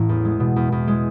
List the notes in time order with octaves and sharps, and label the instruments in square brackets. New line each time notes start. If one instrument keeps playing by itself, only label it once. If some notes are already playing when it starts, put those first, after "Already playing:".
Already playing: [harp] A1 A2
E2
G#3
B2
E2
E2
G#3